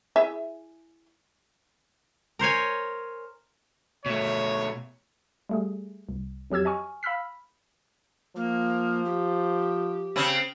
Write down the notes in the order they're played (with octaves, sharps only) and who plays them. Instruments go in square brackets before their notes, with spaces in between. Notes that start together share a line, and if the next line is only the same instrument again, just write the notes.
[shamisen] E4 G#4 E5
[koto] A#4 C5 C#5 G#5
[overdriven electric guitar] B2 A3 [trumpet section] C#5
[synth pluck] G3 A3 G#4
C2
F2 F#3 G4 E6 G#6
D#5 G#5 C#6 F6
F5 B5 E6 F6 B6
[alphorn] F3 [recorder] A#3
[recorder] G4
[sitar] C#3 C4